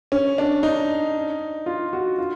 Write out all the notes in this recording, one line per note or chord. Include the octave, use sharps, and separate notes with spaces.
C#4
D4
D#4
F4
F#4
F4